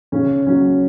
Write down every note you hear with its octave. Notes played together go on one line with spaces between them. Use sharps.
C#3 C#4
F#3 C#4